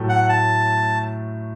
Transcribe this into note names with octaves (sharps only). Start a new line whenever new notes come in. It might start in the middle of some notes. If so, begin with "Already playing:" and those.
Already playing: A2 F#3 A3
F#5
A5